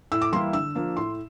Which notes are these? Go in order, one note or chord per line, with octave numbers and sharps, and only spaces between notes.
A2 E6
D6
E3 G3 A#3 E4 C6
D3 E6
F3 A#3 D4
A2 C6